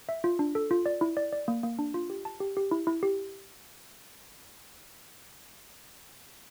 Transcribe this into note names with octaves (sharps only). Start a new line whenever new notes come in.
E5
F4
D4
A4
F4
D5
E4
D5
D5
A#3
A#3
D4
F4
G4
A5
G4
G4
E4
E4
G4